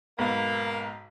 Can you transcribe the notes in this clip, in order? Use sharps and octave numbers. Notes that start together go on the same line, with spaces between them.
B1 G#2 A#3 B3